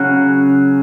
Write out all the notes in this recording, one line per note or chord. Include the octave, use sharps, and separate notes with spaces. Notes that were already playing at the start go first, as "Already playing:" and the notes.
Already playing: C#3 F#3 C#4 F#5